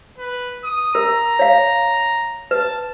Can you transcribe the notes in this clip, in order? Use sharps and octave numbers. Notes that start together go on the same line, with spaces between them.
B4
D#6
A#4 A#5
C#5 F5
B4 A5